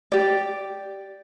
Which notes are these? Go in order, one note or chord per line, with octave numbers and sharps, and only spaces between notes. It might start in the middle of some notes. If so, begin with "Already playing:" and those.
G4 D5